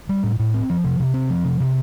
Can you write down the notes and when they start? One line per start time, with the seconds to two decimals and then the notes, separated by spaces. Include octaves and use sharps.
0.09 G3
0.23 A2
0.39 A2
0.54 C4
0.70 F3
0.84 C3
1.00 C3
1.14 C4
1.30 F3
1.44 C3
1.60 C3